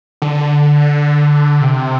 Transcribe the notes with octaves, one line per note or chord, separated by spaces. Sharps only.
D3
C3